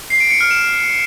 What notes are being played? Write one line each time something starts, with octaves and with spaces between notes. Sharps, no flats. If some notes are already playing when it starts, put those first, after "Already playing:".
C7
D7
C#7
F6
E7